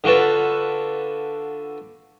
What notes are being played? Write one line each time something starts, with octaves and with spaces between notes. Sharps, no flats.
D3 F4 F#4 A4 B4